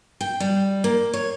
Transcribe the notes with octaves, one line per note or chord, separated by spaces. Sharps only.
G5
G3
A#3
C#5